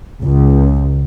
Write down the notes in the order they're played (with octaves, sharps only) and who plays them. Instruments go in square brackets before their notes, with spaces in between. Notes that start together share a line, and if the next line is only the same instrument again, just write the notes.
[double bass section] C#2